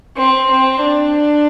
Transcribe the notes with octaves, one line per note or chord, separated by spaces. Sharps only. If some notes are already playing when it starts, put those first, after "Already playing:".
C4
C4
D4